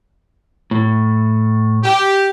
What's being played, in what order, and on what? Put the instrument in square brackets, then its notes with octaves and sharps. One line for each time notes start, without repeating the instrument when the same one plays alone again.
[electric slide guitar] A2
[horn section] G4